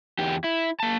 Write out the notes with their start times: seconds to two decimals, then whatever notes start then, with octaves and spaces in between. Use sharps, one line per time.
0.19 E2 G4
0.44 E4
0.80 A#3 A5